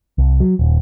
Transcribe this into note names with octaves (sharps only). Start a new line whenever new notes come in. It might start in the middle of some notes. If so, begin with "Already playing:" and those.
C2
F#3
D#1